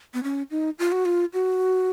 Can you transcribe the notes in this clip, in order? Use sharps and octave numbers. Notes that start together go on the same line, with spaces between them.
B3
C#4
D#4
F4
F#4
F4
F#4